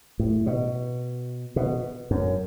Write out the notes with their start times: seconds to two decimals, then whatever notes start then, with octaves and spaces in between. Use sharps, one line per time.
0.19 A2
0.46 B2
1.56 B2
2.11 F#2